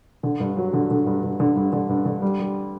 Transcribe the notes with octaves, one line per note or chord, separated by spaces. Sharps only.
D3
G2
F#3
D3
D3
G2
G2
D3
G2
D3
G2
D3
G3
G3